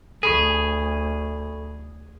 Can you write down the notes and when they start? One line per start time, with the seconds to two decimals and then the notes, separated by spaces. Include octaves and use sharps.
0.23 D2 G#4 A4 B5 C#6